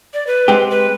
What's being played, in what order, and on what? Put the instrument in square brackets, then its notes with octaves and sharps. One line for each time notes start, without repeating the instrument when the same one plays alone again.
[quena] D5
B4
[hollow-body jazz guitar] G#3 C4 G4
[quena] B4